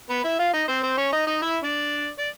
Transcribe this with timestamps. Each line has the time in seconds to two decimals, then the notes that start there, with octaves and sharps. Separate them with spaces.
0.10 B3 B4
0.24 E4 E5
0.39 F4 F5
0.53 D#4 D#5
0.68 C4 C5
0.83 C4 C5
0.97 C#4 C#5
1.13 D#4 D#5
1.27 D#4 D#5
1.42 E4 E5
1.63 D4 D5
2.19 D5